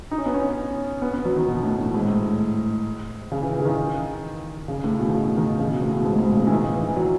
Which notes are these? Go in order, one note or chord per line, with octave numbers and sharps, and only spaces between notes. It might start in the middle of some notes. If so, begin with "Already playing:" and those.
D#4
C#4
B3
C#4
B3
B3
F#3
D#3
B2
A2
A2
G#2
A2
C#3
E3
E3
C#3
D#3
C#3
A2
B2
D#3
C#3
D#3
C#3
B2
A2
B2
G#2
G#2
A2
C#3
B2
E3
D#3
E3
E3
F#3